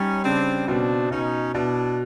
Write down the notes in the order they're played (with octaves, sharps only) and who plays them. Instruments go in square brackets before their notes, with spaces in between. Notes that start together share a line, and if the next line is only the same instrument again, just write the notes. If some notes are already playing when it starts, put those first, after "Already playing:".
Already playing: [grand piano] G3 [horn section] C#4 D#4
[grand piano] C#3 [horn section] C4 D4
[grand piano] B2 [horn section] C4 D4
[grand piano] B2 [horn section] C#4 D#4
[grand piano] B2 [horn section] D4 E4